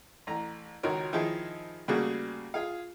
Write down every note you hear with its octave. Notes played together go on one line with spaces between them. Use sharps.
A1 A#5
G#1 C#2 D#4 F#4 A#4 C#5
D#3 F3 D#4 E4 G#4
C#3 G3 A3 A#3 F#4 G#4
F4 G#4 F5